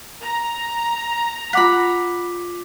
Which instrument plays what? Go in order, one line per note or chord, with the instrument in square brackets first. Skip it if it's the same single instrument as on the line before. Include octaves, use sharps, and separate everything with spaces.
[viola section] A#5
[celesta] F4 D6 B6 [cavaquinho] F#5 B5